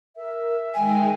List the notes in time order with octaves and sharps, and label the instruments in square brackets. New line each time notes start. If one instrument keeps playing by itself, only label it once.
[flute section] A#4 [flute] E5
[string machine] D#3 G#3 [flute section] G5 [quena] G#5